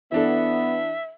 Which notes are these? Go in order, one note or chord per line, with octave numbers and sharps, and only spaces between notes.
E3 B3 D4 A4 E5